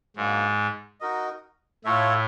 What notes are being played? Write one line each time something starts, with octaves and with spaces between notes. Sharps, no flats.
G#2 F#3 A#3 D4
D#4 F#4 A#4 D#5
A2 F4 A4 C#5 E5